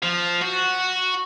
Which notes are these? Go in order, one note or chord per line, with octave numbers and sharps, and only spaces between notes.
F3
F#4